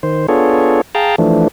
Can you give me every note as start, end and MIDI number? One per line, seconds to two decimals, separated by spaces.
0.03 0.27 51
0.03 0.27 72
0.28 0.81 59
0.28 0.81 62
0.28 0.81 65
0.28 0.81 68
0.28 0.81 69
0.28 0.81 73
0.95 1.16 68
0.95 1.16 77
0.95 1.16 79
0.95 1.16 81
0.95 1.16 82
1.18 1.48 52
1.18 1.48 53
1.18 1.48 57
1.18 1.48 62